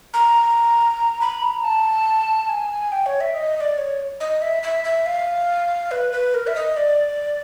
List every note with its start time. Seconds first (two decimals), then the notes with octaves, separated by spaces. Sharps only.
0.14 A#5
1.21 B5
1.42 A#5
1.64 A5
2.49 G#5
2.92 G5
3.06 C#5
3.21 E5
3.34 D#5
3.56 D#5
3.61 D5
3.78 C#5
4.20 D#5
4.42 E5
4.63 E5
4.84 E5
5.06 F5
5.91 B4
6.12 B4
6.34 A#4
6.47 E5
6.56 D#5
6.77 D5